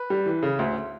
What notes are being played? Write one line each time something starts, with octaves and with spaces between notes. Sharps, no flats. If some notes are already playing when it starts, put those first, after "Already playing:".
Already playing: B4
G3
E3
C#3
D2